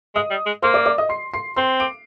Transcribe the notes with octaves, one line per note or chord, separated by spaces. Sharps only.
G#3 D#5 D#6
G3
G#3
A#3 C5 C6
D5 D6
D5 D6
D#5 D#6
C6 C7
C6 C7
C4 C6 C7
D6 D7